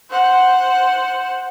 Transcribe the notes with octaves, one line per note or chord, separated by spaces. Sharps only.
C5 F#5